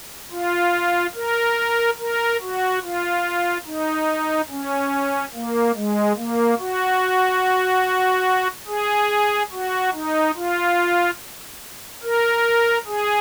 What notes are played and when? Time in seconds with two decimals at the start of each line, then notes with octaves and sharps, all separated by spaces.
0.31 F4
1.15 A#4
1.99 A#4
2.41 F#4
2.83 F4
3.66 D#4
4.50 C#4
5.34 A#3
5.75 G#3
6.17 A#3
6.59 F#4
8.68 G#4
9.52 F#4
9.94 D#4
10.35 F4
12.03 A#4
12.86 G#4